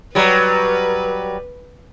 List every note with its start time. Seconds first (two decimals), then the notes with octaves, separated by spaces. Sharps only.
0.15 F#3 G3 B4